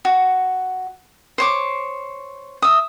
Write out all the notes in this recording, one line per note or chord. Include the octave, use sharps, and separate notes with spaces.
F#4
C5 C#5 D6
E5 D#6